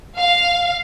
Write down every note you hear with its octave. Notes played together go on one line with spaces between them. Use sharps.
F5